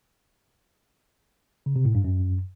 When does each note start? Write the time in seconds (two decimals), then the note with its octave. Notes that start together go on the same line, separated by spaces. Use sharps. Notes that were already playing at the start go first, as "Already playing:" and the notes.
1.66 C#3
1.76 C3
1.85 A2
1.95 G2
2.04 F#2